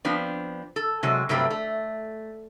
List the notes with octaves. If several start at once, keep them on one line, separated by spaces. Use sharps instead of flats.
F3 B3 C4 D4
A4
C3 F#3 G#3
G2 C3 F#3 G3 A3 C4
A3